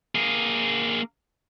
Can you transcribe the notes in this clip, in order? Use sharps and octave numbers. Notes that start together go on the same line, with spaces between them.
A#3 G#4